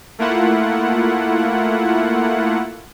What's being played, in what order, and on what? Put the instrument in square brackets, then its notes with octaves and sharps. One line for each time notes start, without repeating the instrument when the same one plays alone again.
[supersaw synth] A3 A#3 E4 F4 F#5